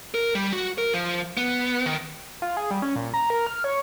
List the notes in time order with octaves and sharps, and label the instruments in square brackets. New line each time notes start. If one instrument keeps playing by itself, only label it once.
[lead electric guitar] A#4
G3
F#4
A#4
F3
B3
D#3
[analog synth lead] F4
G#4
G3
C#4
A#2
A#5
A#4
F6
C#5